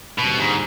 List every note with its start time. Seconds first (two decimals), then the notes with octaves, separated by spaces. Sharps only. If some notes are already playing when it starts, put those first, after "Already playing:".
0.18 D#2 B2 D3 G3 C4
0.38 G#2